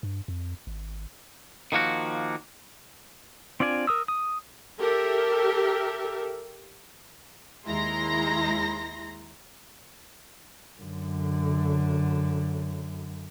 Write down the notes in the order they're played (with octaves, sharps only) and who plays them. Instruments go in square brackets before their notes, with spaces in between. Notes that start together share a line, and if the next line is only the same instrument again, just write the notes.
[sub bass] G2
F2
G#1
[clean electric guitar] D#3 F3 A#3 F#4
[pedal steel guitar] C4 D4 F4 D5 G#5
A#4 D#6 E6
D#6
[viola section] G4 A4 A#4 E5
[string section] D#2 G#3 E4 A#5 C6 A#6
[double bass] F#2 D3